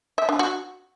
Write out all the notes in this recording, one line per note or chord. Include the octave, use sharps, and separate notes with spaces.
E5
D4
F#4